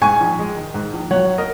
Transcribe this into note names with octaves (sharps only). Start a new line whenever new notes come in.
G#2 G#5 C#6
A#1
G#3
D#3
G#2
A#1
F#3 C#5 F#5
A#4 D#5